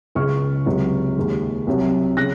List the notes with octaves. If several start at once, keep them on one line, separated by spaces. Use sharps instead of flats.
C#2 C#3 G#3 C#6 F6
C#2 C3 F#3
D#2 D#3 G#3
C2 C3 F#3
C#3 F#6 A#6